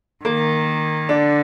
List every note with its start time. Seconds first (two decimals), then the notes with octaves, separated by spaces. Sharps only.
0.24 D#3 A#3
1.09 D3 D4